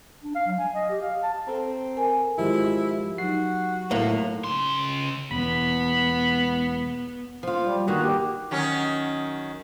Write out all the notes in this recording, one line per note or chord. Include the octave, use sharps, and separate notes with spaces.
D4
F5
F#3
G#5
D#5
G4
F5
A5
C4 A4 A#5
A#4 G#5
G#1 F3 G#3 E4 G4
F#3 D#4 F#4 C7
A#1 A2 A#3
C#3 C6
E1 E2 B3 B5
F3 F4
G3
G2 D#3 A#3 F#4
G4
D#3 F#3 C#4